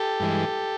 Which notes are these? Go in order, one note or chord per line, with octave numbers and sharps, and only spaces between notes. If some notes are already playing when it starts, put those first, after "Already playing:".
Already playing: G4 A4
G2 E3 G#3